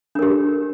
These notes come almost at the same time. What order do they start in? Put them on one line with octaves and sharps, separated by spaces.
D4 A#4 G4